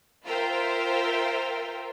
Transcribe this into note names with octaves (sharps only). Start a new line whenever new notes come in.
F4 A#4 C5 E5 G5